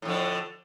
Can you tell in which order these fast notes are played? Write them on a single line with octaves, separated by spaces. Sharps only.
A2 F2 D3